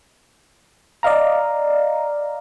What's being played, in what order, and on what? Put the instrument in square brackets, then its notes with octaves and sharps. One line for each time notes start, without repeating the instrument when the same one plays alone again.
[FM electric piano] D5 D#5 F5 A#5